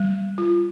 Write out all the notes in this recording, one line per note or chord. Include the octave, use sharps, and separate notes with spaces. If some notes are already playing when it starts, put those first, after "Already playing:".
Already playing: G3
F4